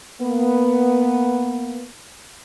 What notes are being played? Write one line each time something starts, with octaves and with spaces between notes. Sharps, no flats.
A#3 B3